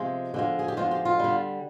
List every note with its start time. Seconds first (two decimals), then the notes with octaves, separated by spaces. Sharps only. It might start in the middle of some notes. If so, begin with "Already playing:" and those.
Already playing: C3 F3 G#3
0.34 D3 F3 G#3
0.59 G#4
0.68 G4
0.77 D3 F3 G#3 F4
0.91 G4
1.05 F4
1.19 D3 G3